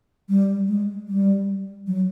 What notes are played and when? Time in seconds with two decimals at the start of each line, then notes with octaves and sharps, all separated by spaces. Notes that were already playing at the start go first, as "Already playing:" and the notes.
0.29 G3
0.68 G#3
1.08 G3
1.87 F#3